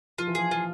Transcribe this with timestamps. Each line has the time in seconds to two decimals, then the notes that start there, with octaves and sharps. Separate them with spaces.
0.18 F3 F4
0.27 E3
0.35 F3 G#4
0.51 F3 F4